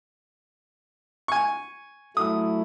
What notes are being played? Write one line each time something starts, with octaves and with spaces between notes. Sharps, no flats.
G#5 C#6
F#3 A3 E4 D#6